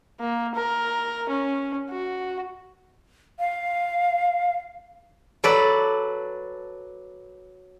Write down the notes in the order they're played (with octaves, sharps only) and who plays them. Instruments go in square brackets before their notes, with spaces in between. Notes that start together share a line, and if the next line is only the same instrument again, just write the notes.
[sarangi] A#3
A#4
C#4
F#4
[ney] F5
[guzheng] F#3 A4 B4 D5